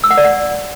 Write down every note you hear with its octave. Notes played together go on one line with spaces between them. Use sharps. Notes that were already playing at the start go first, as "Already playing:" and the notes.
E6
F#5
D5
F#5